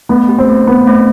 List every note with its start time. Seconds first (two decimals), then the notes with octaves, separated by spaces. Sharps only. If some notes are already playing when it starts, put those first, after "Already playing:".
0.09 A3 B3
0.29 G4
0.38 C4
0.48 A3
0.67 A3 B3
0.87 A3 C4